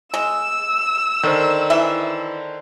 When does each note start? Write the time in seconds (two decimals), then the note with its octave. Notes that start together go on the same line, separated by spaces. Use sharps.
0.14 G#3 E6
1.23 D3 D#3 C5 D5
1.70 E3 E5